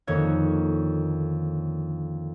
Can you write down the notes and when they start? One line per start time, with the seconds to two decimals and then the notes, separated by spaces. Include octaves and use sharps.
0.07 F2 D3 D#3 A#3 C#5 G#6